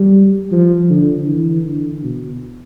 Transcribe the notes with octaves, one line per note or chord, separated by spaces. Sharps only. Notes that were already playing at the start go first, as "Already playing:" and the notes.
Already playing: G3
F3
D3
E3
D3
B2